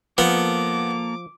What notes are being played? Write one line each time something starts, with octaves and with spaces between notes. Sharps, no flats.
F3 A#3 B3 A4 D6